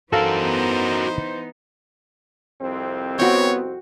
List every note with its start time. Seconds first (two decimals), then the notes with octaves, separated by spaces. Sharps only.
0.13 E3 B3 D#4 F#4 A4 A#4 C5 F5
2.62 C2 F2 C4
3.19 B3 F#4 C#5 G5